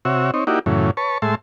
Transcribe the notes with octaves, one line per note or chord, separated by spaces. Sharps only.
C3 F#4 C#5 E5
C4 D#4 C#5
A#3 D#4 E4 F#4 G4 D5
F#2 A2 C#3 E3
B4 C#5 A5 C#6
A2 G#3 E5 A5 C6